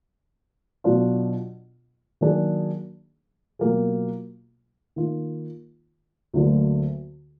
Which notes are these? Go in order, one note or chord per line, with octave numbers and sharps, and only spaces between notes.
B2 F#3 D4 F4
D#3 F#3 A#3 D4 G#4
B2 F#3 A#3 F4 G#4
D#3 A#3 F4
D2 D3 F#3 A#3